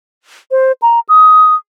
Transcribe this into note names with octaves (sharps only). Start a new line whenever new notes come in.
C5
A#5
D#6